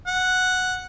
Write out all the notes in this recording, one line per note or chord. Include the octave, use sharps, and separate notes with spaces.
F#5